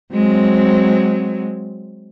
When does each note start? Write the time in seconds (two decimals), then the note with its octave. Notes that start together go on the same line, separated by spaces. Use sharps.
0.14 F#3 G#3 C4